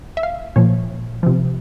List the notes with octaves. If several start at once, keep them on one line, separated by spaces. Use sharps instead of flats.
E5
F5
A#2 F3 C#5
C3 F3